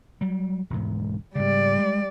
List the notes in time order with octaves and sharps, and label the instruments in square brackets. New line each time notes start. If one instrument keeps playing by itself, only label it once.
[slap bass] F#3 G3
E1 D2 G#2
[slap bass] G#2 C#3 [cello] G3 D5
[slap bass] G#3